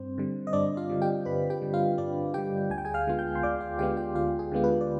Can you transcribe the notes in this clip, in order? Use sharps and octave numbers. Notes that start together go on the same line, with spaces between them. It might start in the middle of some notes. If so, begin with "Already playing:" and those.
Already playing: G2 C4 C5
D3 G3
D#5
G2 D4 D5
F4 F5
D3 G3
G4 G5
G2 B4 B5
G4 G5
D3 G3
F4 F5
G2 D4 D5
D3 G3 G4 G5
D2 G#5
G5
G#4 G#5
F5 F6
D3 G#3 B3 F4
G5 G6
C6
D2 D5 D6
F4 F5
D3 G#3 B3 F4 G4 G5
G4 G5
D2 F4 F5
G#4
D3 G#3 B3 F4
B4
D5